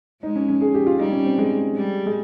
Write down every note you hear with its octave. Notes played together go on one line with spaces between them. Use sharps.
G#3 D#4
C#4
C#4
G#4
G4
F4
G3 D#4
C#4
C4
G#3
G3
G#3